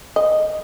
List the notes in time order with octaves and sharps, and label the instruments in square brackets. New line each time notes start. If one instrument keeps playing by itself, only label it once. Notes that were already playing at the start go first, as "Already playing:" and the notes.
[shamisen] D#5